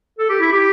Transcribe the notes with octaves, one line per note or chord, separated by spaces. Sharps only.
A4
G4
E4
G4